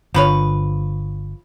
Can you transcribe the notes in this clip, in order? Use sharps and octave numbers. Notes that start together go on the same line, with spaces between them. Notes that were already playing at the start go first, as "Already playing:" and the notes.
G1 D3 F3 B4 C#5